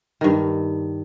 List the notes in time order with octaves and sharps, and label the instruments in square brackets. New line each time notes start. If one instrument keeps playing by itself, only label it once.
[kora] G2 D#3